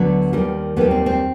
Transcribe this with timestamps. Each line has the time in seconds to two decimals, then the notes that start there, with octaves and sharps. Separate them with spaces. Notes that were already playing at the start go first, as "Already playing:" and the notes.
Already playing: D2 D3 F#3 B3
0.33 D#2 D#3 G3
0.76 D#2 D#3 G3 B3
0.91 C4
1.06 C4